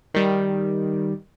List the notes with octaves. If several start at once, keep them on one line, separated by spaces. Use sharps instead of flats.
D#3 G3